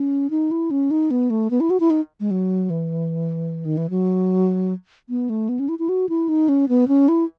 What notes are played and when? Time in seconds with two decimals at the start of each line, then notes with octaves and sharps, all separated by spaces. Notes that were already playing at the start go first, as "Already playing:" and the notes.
Already playing: C#4
0.30 D#4
0.51 E4
0.71 C#4
0.91 D#4
1.11 B3
1.30 A3
1.51 B3
1.60 E4
1.70 F#4
1.80 E4
1.90 D#4
2.20 G#3
2.31 F#3
2.70 E3
3.65 D#3
3.77 E3
3.90 F#3
5.09 B3
5.30 A3
5.49 B3
5.59 C#4
5.69 E4
5.79 E4
5.89 F#4
6.09 E4
6.29 D#4
6.49 C#4
6.69 B3
6.88 C#4
7.08 E4